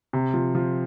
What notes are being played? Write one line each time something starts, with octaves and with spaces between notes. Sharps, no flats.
C3
F3
F3